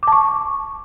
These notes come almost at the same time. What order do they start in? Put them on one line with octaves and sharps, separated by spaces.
D6 A5 C#6